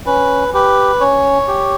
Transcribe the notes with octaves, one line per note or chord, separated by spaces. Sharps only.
C#4 B4
G4 B4
C#4 C#5
G4